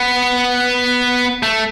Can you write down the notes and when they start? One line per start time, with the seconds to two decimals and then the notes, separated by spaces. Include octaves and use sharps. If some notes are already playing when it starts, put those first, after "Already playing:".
Already playing: B3
1.43 A3